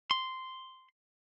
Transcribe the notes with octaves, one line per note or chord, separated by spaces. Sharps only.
C6